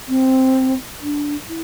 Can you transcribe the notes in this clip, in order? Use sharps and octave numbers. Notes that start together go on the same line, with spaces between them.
C4
D4
E4